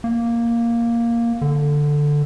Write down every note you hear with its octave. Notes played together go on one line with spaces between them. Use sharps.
A#3
D3